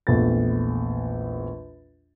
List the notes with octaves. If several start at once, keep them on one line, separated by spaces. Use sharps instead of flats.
A#1 E2 A3 A6